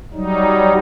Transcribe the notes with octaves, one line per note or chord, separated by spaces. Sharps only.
F#3 G3 D#4